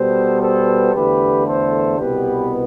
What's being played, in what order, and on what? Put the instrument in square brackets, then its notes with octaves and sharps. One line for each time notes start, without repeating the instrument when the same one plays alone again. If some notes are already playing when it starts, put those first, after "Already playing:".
Already playing: [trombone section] B2 G3 B3 A4 C5
A4 C5
E2 D3 A3 G4 B4
A4 C5
C2 B2 B3 G4 B4